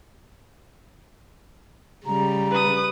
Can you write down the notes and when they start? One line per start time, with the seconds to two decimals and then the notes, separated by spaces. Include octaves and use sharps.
2.06 C#3 G3 A#5
2.51 B4 D#6